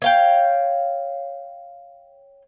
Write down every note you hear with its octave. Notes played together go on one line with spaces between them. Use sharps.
C#5 F5 G5